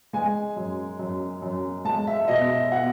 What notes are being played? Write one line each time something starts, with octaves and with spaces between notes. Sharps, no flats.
G#3 G#5
F#2
F#2
F#2
G#3 A5
E5
B2 D#5
E5
B2 F#5